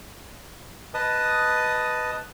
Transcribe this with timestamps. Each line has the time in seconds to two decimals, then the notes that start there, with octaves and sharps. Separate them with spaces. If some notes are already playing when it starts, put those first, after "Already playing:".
0.94 B4 D#5 A5 D#6